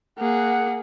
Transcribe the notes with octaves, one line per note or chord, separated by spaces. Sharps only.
A#3 G#4 F#5